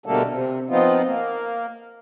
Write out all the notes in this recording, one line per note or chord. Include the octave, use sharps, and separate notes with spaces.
B2 D3 G3 A3 A#3 A4
C3
F3 B3 C4 D#4 F4
A#3